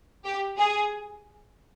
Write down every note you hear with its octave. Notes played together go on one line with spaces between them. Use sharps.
G4
G#4